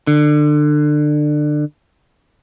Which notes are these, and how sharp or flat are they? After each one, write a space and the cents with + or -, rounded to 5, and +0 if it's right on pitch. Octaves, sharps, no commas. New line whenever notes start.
D3 +25